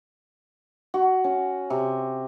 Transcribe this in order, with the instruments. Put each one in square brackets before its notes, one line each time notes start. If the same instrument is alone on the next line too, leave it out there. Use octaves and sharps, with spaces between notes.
[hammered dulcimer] F#4
C#4
C3